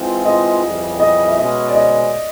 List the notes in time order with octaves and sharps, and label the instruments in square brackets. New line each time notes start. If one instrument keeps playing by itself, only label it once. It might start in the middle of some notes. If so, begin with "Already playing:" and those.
Already playing: [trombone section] E3 G#3 C4 F4
[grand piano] D#5
[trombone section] F2 C#3 E3 G3
[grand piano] D#5
E5
[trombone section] B2 G#3 C#4 [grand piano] D#5
[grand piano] D5
D#5